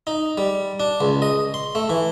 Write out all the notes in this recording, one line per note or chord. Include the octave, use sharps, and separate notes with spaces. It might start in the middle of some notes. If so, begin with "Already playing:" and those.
D#4
G3
D4
C#2
D#5
C6
A3
E3